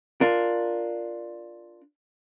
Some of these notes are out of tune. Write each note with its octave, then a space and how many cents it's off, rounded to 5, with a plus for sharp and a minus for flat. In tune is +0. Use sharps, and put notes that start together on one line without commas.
D4 +0 F4 +0 A#4 +0